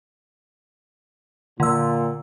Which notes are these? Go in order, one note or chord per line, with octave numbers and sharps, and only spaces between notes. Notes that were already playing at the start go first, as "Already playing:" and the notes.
A#2 D3 E6